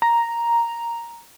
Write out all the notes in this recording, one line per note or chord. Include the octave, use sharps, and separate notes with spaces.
A#5